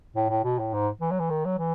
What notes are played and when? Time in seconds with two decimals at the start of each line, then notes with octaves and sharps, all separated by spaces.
0.16 A2
0.29 A2
0.44 B2
0.59 A2
0.73 G#2
1.01 E3
1.11 F#3
1.20 E3
1.30 D#3
1.45 F#3
1.59 E3